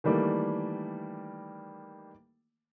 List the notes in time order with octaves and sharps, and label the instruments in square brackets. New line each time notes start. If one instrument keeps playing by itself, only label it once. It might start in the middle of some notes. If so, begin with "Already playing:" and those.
[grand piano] D#3 E3 G3 A3 A#3 D5